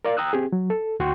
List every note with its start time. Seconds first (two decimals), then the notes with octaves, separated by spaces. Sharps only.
0.05 A#4 D5 F5
0.17 G5 A#5 D#6 E6 F#6
0.33 C4 G4 G#4
0.52 F#3
0.70 A4
1.00 D2 F#4 G5 C6 C#6